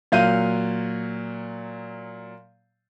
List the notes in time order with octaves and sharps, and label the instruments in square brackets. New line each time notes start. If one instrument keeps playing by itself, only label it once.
[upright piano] A#2 F#3 F5 G6 D#7